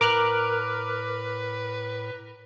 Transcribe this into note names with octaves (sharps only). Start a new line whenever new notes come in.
A2 A#4 B4 D6 F6 F#6